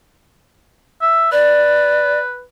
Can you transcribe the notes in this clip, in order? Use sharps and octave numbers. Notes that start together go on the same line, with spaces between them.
E5
B4 D5